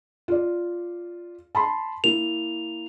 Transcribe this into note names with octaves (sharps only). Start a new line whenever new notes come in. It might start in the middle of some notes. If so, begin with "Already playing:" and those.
F4 D5
A5 B5 C6
A#3 E4 F7